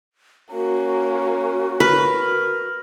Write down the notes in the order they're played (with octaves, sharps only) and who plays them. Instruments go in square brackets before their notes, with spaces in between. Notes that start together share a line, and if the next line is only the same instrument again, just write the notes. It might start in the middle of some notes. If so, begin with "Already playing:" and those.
[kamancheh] A#3 C#4 [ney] F#4
[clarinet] A#4 [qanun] B4